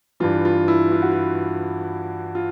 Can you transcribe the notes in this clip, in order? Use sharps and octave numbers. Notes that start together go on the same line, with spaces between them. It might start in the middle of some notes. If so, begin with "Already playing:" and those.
G2 E3 F4
F4
E4
F4
F#4
F4
F4